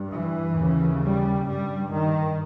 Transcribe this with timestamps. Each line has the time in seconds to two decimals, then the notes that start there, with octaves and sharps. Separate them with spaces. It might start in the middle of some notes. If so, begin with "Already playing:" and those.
Already playing: G2
0.13 E3
0.58 D#2 C#3
1.03 G3
1.47 G2 G3
1.92 D#3